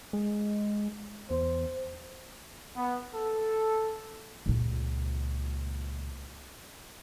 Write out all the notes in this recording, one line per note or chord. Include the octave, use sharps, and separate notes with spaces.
G#3
E2 C5
B3
A4
C#2 A#2